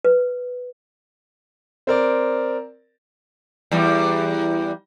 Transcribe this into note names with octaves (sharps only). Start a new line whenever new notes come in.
B4
C4 A#4 D5
E2 G3